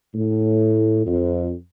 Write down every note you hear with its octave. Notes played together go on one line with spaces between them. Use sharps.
A2
F2